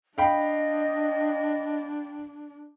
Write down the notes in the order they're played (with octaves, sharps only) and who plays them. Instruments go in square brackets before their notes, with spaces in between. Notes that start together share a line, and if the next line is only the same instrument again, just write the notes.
[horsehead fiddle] D4 [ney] D#5 [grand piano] F5 G5 B5